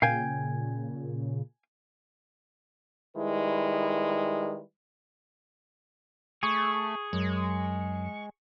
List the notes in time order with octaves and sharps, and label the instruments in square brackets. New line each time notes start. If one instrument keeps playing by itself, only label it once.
[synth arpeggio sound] A#2 C#3 [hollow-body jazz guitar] F5 G5 G#5
[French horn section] D#3 G3 G#3 E4 B4
[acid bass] A3 [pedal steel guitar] G#4 C#6
[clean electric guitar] F#2 [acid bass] G#3